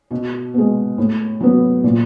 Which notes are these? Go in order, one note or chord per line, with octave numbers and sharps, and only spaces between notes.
B2
G#3 B3
A2
F#3 B3
A#2